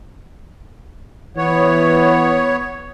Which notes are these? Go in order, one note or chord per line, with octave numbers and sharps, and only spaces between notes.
E3 B3 C#5